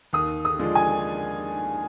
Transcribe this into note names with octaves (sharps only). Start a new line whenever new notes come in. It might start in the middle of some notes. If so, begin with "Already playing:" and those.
D#2 D#6
D#6
D3 F3 G#3 D4
G#5